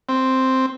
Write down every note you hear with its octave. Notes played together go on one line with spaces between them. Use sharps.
C4